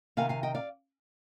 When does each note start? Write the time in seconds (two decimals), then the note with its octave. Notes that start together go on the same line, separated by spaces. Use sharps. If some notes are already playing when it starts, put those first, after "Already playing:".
0.17 C3 D#3 B3 F5 G#5
0.29 F5 G#5
0.43 D#5 G5
0.55 D5 F5